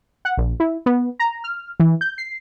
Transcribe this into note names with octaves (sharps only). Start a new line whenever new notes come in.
F#5
A#1
E4
B3
A#5
F6
E3
G6
C7